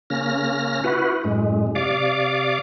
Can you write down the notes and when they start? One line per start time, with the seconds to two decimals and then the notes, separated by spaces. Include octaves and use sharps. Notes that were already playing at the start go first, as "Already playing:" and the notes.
0.10 C#3 A#3 C#4 F6 A#6
0.84 E4 F#4 B4
1.24 F#2 A2 G#3
1.75 C3 D5 F5 D6